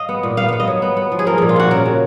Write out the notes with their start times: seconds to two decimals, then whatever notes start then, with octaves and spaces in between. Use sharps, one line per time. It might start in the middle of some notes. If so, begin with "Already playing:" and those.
Already playing: D#5 F5
0.09 B3
0.23 A#2
0.37 B3 F5
0.48 B3 F5
0.60 D#5
0.67 F#3
0.82 B3
0.97 B3
1.12 F3
1.19 G#4
1.26 F3 A#4
1.38 A#2 G#4
1.49 F4
1.56 A#2 F#4
1.71 C#3 A#4
1.85 C#3